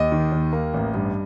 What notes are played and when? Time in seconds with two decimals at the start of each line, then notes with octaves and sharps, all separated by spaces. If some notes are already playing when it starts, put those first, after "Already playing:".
Already playing: D#2 D#5
0.12 D#3
0.32 D#2
0.53 A#3
0.74 A1
0.94 G2